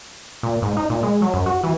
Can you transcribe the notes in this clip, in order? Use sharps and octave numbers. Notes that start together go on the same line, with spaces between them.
A#2
G#2
D#4
A#2
G#3
F#3
F#2
F#4
E3